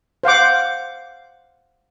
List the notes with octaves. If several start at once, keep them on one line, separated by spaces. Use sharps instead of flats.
C5 F5 F#5 D6